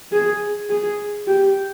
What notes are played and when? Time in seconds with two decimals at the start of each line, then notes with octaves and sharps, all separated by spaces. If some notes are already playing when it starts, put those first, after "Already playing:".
0.12 G#4
0.70 G#4
1.27 G4